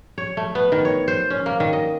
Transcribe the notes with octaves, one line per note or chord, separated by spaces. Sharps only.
C#5
A3
B3
D#3
C#5
C5
C#4
A#3
D#3
D#5